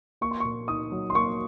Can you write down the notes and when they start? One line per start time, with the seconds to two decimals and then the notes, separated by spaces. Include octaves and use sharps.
0.21 A#3 C#6
0.31 C6
0.40 A#2 C#6
0.68 D#4 D#6
0.92 F#3
1.10 C6
1.15 A#3 C#6